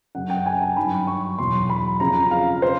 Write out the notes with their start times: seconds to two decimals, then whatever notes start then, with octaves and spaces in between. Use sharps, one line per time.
0.15 F#2 C#3 F#3 F#5
0.30 G5
0.46 G#5
0.61 A5
0.76 G2 D#3 F#3 B5
1.07 C#6
1.38 E2 B2 F#3 C6
1.70 B5
2.00 F2 C#3 F3 A#5
2.31 F5
2.62 C5